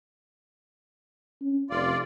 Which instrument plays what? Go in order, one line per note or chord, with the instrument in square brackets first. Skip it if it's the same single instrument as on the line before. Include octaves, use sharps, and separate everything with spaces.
[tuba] C#4
[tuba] F1 [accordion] F4 D5